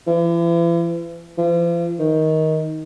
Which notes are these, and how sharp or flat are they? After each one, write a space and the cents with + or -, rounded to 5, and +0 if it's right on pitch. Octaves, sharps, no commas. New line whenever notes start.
E3 +40
F3 -40
D#3 +15